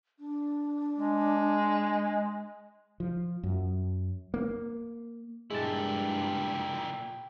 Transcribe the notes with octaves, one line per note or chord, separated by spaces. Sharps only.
D4
G#3
F3
F#2
A#3
G2 A#2 G#3 E4 G4 A5